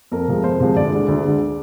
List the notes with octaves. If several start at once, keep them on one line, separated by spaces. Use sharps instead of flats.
F2 A#4
C3 F3 G#3
F2 C5
C3 F3 G#3
D2 D5
D3 G#3
D2
D3 G#3